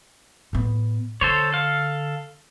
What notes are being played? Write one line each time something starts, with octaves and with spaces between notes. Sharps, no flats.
A2 B3
D3 A4 C5 C#5
A4 F5